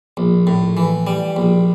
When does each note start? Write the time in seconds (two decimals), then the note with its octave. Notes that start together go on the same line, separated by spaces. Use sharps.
0.17 A#1
0.47 A2
0.77 E3
1.07 G3
1.36 A#1